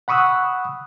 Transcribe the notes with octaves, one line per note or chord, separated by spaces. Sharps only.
F#5 B5 C#6 D#6 E6 F#6